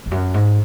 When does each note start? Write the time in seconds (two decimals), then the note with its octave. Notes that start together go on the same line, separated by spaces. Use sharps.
0.06 E2
0.11 F#2
0.34 G#2